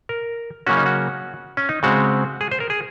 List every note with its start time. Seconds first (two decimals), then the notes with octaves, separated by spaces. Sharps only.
0.09 A#4
0.66 C#3 F#3 A#3 C#4 F#4
0.77 D#4
0.86 F#4
1.57 C#4
1.69 D#4
1.83 C#3 G#3 C4 F#4
2.41 G#4
2.51 C5
2.60 A#4
2.70 G#4